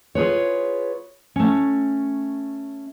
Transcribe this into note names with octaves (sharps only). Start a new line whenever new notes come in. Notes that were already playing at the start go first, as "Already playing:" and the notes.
F4 G#4 B4 C#5
A3 C#4